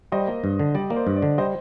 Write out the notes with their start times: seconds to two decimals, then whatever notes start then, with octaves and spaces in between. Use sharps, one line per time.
0.12 G3 C5 D#5
0.27 A#3
0.44 G2
0.59 D3
0.75 G3 D5
0.90 A#3
0.96 C5
1.07 G2
1.16 D5
1.22 D3
1.38 G3 C5 D#5